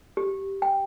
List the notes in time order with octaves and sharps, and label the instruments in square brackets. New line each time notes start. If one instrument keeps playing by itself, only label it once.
[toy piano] G4
G5